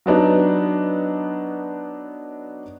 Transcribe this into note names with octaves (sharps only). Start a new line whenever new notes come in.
F#3 B3 D4 D#4